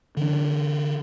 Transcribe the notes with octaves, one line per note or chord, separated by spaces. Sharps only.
D3 E3 D4